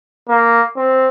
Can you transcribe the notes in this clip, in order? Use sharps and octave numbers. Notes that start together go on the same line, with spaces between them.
A#3
C4